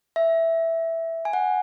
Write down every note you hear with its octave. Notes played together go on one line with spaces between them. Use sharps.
E5
G#5
F#5